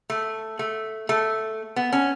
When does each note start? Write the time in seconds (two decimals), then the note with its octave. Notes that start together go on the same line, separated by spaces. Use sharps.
0.10 A3
0.59 A3
1.09 A3
1.76 B3
1.93 C#4